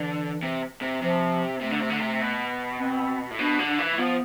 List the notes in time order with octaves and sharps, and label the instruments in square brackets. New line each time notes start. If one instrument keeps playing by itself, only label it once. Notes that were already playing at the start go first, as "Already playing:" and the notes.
Already playing: [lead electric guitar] D3 [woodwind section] E3
[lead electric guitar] C3
C3
[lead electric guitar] C3 [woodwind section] F3
[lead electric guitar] C3 [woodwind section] A3
[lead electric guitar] D3
C3
D3
C3
B2
[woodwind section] C4
[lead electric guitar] A2
[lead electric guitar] B2 [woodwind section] D4
[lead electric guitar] D3
E3
[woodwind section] A3
[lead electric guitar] F3 [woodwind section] B3